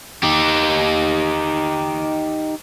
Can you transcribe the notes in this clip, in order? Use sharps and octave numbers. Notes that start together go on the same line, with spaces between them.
D#4 G4